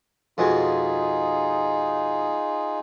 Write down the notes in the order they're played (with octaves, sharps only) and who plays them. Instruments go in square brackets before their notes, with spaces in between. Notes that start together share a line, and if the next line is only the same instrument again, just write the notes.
[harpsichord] F2 B2 G#3 [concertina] D#4 F4 G#4